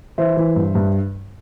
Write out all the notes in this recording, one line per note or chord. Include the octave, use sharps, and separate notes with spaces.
E3 C5 E5
E3
G2
G2